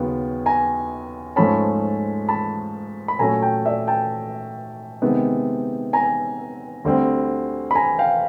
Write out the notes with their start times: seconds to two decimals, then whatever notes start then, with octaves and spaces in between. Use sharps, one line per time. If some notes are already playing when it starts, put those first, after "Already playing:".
Already playing: D#2 C#3 F#3 B3
0.46 G#5 A#5
1.36 G#2 F3 A3 C#4 A5 B5
2.29 A5 B5
3.08 B5
3.19 A#2 F#3 A3 C#4 G#5 A#5
3.42 G5 A5
3.66 D5 E5
3.87 G5 A5
5.02 C3 D#3 G#3 B3
5.93 G#5 A#5
6.84 D2 D3 G3 C4
7.71 B5
7.75 G#5 A#5
7.98 F5 G5